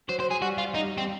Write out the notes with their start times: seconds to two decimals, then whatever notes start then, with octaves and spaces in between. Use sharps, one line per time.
0.09 F#3 C5
0.20 C5
0.30 G#4
0.42 G3 F#4
0.58 F4
0.75 D#4
0.98 C4